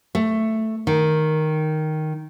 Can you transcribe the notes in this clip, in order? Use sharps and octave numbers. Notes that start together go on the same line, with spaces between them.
A3
D#3